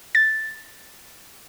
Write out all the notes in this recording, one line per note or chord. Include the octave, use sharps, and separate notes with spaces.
A6